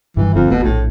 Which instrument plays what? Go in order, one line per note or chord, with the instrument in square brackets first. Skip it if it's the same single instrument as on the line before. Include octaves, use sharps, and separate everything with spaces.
[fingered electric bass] G2 D#3 G3 [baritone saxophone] E3
[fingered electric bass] G1 D3 [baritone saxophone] F2
[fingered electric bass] E1 A3 [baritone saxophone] B2
[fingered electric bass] A#1 [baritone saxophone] A2